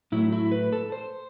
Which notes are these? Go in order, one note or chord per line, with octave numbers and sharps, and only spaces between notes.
A2 F#3 A3 E4
E4
B4
A4
C5